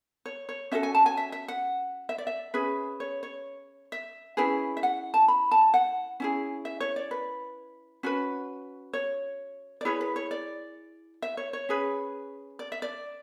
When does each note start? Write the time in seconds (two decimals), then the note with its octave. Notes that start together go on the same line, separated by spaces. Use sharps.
0.26 C#5
0.49 C#5
0.72 C#4 F#4 A4 E5
0.83 G#5
0.95 A5
1.06 G#5
1.17 E5
1.32 E5
1.48 F#5
2.09 E5
2.18 D5
2.27 E5
2.54 C#4 G#4 B4
3.00 C#5
3.23 C#5
3.92 E5
4.37 C#4 E4 G#4 B4
4.77 E5
4.83 F#5
5.14 A5
5.28 B5
5.51 A5
5.74 F#5
6.20 C#4 E4 G#4
6.65 E5
6.80 C#5
6.96 D5
7.11 B4
8.03 C#4 F#4 B4
8.93 C#5
9.81 D5
9.85 E4 G#4 B4 C#5
10.01 B4
10.16 C#5
10.31 D5
11.22 E5
11.37 C#5
11.53 C#5
11.69 C#4 G#4 B4
12.59 D5
12.72 E5
12.82 D5